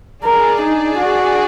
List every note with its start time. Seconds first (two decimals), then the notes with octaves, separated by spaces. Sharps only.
0.24 D4 G#4 A#4 D5
0.62 D#4
0.98 F#4